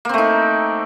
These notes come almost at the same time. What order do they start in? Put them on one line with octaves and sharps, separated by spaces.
A#3 C4 A3 D#4